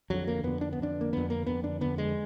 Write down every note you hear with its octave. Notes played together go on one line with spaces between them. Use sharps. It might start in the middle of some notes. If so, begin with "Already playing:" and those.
F2 D3 F#3
A#3
F2 D3 B3
D4
B3
F2 D3 D4
A#3
F2 D3 B3
A#3
F2 D3 B3
D4
F2 D3 B3
G#3